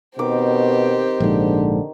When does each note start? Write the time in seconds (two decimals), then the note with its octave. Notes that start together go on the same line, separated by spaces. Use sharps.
0.19 B2 D#3 C4 G4 D6
1.20 A#1 G#2 D3